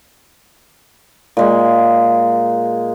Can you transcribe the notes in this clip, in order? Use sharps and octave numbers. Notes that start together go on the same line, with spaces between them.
A#2 G#3 A#3